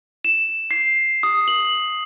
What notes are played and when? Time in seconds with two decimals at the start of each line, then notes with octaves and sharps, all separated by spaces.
0.25 E7
0.71 C7
1.23 D#6
1.48 F#7